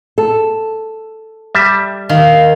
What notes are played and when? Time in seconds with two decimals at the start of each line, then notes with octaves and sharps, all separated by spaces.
0.18 A4
1.55 G3 E5 A5
2.09 D#3 F5